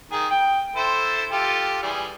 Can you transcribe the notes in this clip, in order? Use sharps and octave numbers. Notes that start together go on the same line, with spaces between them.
D#3 G#4
G5
E4 A4 C5
F4 G4 A4
E3 G3 G#4